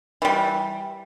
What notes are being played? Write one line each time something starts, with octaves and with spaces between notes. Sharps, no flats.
E3 G3